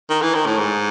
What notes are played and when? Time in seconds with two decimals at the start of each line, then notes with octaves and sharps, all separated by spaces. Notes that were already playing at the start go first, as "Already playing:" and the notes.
0.10 D#3
0.22 E3
0.35 D#3
0.46 A2
0.58 G#2